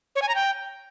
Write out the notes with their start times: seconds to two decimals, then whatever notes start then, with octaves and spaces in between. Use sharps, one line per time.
0.16 C#5
0.22 G#5
0.29 A#5
0.35 G5